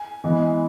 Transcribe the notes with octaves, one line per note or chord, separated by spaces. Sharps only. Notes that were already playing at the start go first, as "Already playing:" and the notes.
Already playing: G#5
E3 G#3 B3